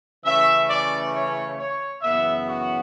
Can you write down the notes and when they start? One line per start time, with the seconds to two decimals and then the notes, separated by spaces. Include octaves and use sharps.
0.24 C#3 E3 A3 C#4 E5
0.69 D5
1.13 C#5
1.58 C#5
2.01 F#2 C#3 E3 B3 E5
2.47 F#4